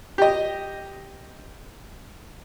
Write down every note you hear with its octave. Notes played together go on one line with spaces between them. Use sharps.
G4 D#5